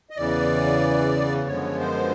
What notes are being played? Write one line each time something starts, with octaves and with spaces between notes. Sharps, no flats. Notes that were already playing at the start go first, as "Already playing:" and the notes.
D#5
E2 C#3 E3 D5
F#2 D3 F3 G#3 B3 C#5
C5